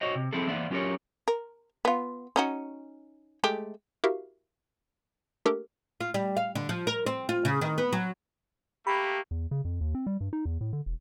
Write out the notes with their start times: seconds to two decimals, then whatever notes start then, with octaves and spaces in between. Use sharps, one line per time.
0.01 F#4 C5 C#5 D#5
0.15 C3
0.33 F3 C4 E4 G#4 A4
0.47 E3 A#3 B3 C5 D5 E5
0.70 F#3 C#4 F4 G4 A#4 C#5
1.28 A#4
1.85 B3 F4
2.36 C#4 D#4 F#4
3.44 G#3 A3 G4
4.04 E4 F#4 G4 A#4 E5 F5
5.45 A3 A#3 D4 G4 A4 A#4
6.00 F4
6.14 G3
6.37 F5
6.55 D3
6.69 F3
6.87 A#4
7.06 C4
7.29 F4
7.45 C#3
7.61 D#3
7.78 B3
7.93 F#3
8.87 A3 A#3 G4 B5
9.31 E2
9.51 C#3
9.65 F2
9.81 D#2
9.95 C4
10.07 G3
10.21 G2
10.33 D#4
10.45 E2
10.61 A2
10.73 D3
10.86 E1